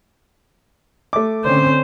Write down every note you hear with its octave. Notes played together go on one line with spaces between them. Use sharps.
A3 D6
D3 C4 C#4 C5